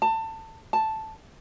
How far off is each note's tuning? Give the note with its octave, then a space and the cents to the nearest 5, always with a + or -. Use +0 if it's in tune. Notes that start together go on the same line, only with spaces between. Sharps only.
A5 +25
A5 +0